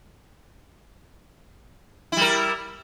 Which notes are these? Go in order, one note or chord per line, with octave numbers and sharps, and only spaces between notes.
G3 E4 A#4